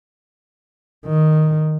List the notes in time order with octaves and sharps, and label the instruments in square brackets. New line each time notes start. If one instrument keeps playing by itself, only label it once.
[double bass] D#3